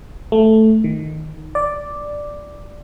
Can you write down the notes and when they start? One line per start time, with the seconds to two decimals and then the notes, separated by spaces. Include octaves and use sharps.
0.32 A3
0.84 D#3
1.55 D5